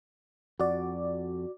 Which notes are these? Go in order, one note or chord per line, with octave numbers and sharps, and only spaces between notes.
F2 F#4 D5